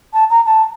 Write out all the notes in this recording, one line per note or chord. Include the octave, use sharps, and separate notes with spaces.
A5
A#5
A5